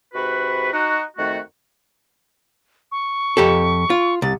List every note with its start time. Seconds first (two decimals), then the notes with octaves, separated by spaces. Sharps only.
0.14 G#2 C3 F#4 B4
0.72 D#4 F#4
1.17 F2 D#3 A3 F#4
2.92 C#6
3.37 F2 G4 A4
3.90 F4
4.22 C2 A6